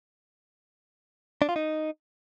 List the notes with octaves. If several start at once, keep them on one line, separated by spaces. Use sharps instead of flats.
D4
F4
D#4